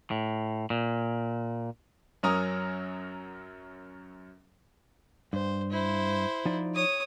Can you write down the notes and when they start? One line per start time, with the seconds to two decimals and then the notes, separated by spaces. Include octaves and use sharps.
0.11 A2
0.70 A#2
2.23 F#2 F#3 C#4 A#4 A#5 D#6
5.33 G2 C5
5.71 E4 C5
6.45 F3 D#4 D5
6.75 C#5 D#6